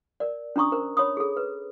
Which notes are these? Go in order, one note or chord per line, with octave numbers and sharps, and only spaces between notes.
A#4 D5
C#4 D4 A#5 C#6 D#6
A#4 C5
C#5 B5 D#6
G#4 A4
B4